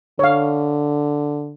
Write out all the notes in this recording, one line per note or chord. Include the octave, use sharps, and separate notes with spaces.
D3 C#5 F5